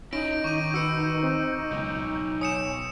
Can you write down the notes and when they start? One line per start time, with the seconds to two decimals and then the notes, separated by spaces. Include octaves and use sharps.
0.13 C#4 D#4 E4 D#5 G6 A#6 D7
0.44 D#3 C#6 D6 D#7
0.74 F#4 B4 E6 C#7 D#7
1.23 C4
1.71 C#2 B2 F#3
2.41 C#5 G#5 D#6 C#7 E7